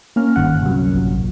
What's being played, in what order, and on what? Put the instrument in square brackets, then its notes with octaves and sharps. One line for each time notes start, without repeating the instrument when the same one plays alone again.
[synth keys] A#3 C#4 F6
[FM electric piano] G1 D#2 F#5
C2 F#2
[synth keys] A1 A#2 F#3